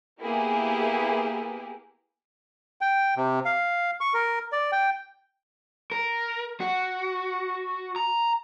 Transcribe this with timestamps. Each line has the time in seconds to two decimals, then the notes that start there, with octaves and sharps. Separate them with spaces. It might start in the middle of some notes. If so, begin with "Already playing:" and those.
0.20 A#3 B3 E4 G4 G#4
2.81 G5
3.17 C3
3.45 F5
4.01 C#6
4.14 A#4
4.52 D5
4.72 G5
5.92 A#4
6.61 F#4
7.96 A#5